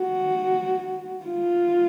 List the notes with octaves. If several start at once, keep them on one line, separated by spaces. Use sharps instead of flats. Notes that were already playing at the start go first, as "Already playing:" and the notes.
Already playing: F#4
F4